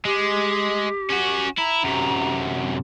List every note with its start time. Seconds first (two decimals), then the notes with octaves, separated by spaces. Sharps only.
0.05 G#3 G4
1.10 C#4 F#4
1.58 E4 A#5
1.84 F#2 C3